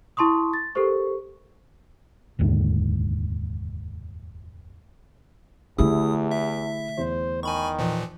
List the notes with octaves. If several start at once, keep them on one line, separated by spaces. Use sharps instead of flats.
E4 A5 C6 C#6 D#6
A6
G4 A4 A#4 C5 C#6
F1 D#2 G#2 D3
E2 D3 A3 E4 G4 G#4 D#6
E5
E2 C5
D#3 G#5 B5 C#6
A#2 E3 F3